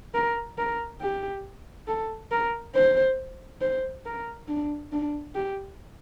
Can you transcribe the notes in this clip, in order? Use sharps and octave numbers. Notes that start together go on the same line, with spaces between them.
A#4
A#4
G4
A4
A#4
C5
C5
A#4
D4
D4
G4